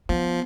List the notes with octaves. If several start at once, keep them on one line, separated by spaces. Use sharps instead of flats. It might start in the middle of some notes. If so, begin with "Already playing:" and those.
F3 B3